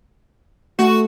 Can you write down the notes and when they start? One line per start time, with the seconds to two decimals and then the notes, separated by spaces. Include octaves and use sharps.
0.79 A3 F#4